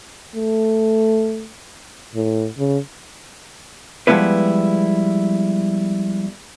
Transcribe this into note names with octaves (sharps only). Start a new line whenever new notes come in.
A3
A2
C#3
F3 G3 G#3 B3 E4 B4